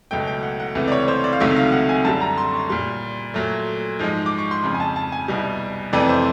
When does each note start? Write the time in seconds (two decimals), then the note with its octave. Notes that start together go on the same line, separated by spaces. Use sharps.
0.11 C#2 B2 F#3 A3 G5
0.27 G5
0.43 F#5
0.60 F#5
0.75 C#2 C3 E3 A3
0.88 D5
0.92 C#5
1.08 C5
1.24 D5
1.33 F5
1.40 C#2 C3 D#3 F#3 A3 E5
1.56 F5
1.72 F#5
1.89 G#5
2.05 F#2 D3 G3 A5
2.21 A#5
2.38 C6
2.53 C#6
2.69 A#2 G3 C6
3.34 A#2 F#3 A3
3.99 G#2 F3 G#3
4.26 D6
4.39 C#6
4.51 C6
4.64 F2 C#3 F3 B5
4.74 G#5
4.80 A5
4.96 A5
5.12 G#5
5.28 C2 B2 G3
5.93 F2 C3 E3 A3 D5
6.09 C5